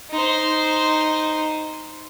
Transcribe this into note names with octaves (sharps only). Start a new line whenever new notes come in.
D#4 C5